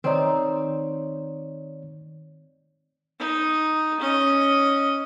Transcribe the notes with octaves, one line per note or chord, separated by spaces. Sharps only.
D#3 C4 D#4 C#5 D5
D#4
C#4 D#5